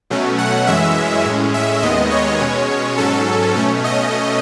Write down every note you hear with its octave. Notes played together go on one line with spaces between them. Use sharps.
B2 F#3 A3 C#4
F#5
F#2 E3 G#3 C#4 E5
A2 G#3 C#4
E5
D#2 D#3 G#3 B3 D#5
C#5
B2 G#3 C#4
G#2 F#3 C#4 A4
B2 A3 C#4
D#5